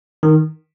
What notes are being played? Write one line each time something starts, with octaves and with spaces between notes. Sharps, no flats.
D#3